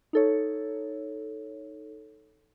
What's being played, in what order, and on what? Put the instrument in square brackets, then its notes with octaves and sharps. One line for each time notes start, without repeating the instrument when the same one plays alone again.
[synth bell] D#4 A4 C#5